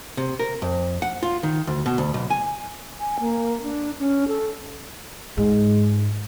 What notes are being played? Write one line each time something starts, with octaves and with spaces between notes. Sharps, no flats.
C3
A#4
F2
F#5
F4
D#3
D2
B2
D2
B1
G#5
G#5
A#3
D4
C#4
A4
G#2 G#3